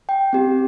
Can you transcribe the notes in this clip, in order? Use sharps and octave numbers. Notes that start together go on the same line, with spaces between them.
G5
C4 G4